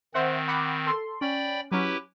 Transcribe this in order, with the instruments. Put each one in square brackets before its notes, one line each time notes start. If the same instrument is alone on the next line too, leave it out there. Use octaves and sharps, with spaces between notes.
[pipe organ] D#3 C4 [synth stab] C5 E5 F#5
[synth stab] F#5 B5 D6
A4 C6
[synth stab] C#4 [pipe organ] D5 G5 B5
[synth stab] F#3 C#4 [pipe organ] E4 G4 B4